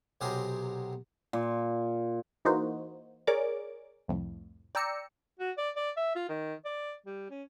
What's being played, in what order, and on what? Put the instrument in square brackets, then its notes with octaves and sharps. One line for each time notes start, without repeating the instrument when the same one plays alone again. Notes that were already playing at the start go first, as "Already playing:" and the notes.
[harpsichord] B1 C3 F#3 G4 G#4 A#4
[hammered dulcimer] A#2
[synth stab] E3 A#3 D#4 F#4 C5
G#4 A#4 C#5 D5 D6
C2 F2 A2
D5 G5 A#5 E6 C#7
[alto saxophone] F#4
D5
D5
E5
F4
D#3
D5
G3
C#4